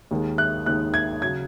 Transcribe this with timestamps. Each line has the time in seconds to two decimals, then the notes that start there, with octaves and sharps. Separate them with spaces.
0.11 D#2 D#3 G#3
0.38 F#6
0.66 D#2 D#3 G#3 F#6
0.94 G#6
1.21 C#3 F#3 G#6